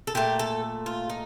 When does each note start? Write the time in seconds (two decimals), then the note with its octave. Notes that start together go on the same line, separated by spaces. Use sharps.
0.07 A4
0.15 A#2 A3 G4
0.39 A4
0.86 F4
1.10 D#4